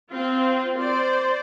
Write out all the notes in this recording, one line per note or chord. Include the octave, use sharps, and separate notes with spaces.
C4 F4
C5 D5